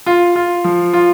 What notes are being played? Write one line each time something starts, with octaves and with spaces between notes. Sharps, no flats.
F4
F4
F3
F4